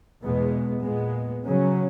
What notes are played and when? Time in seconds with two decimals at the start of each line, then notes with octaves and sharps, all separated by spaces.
0.23 E2 B2 G#3 B3
0.84 A#2 G#3 B3
1.46 C#3 F#3 C#4